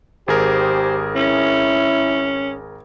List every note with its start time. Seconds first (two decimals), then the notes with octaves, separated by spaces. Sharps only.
0.28 G#1 G4 G#4 A#4 C5
1.16 C#4 E4